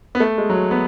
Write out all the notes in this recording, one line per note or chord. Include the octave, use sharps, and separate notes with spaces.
B3
A3
G#3
F#3
B3